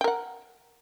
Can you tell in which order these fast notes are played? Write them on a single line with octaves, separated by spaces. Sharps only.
G5 A#4 F#5